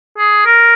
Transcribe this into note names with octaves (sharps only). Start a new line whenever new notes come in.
G#4
A#4